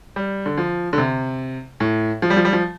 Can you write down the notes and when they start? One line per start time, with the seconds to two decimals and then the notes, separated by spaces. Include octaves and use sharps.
0.16 G3
0.46 D3
0.58 F3
0.93 D3
0.98 C3
1.80 A2
2.22 F3
2.30 G3
2.37 F3
2.45 G3
2.53 F3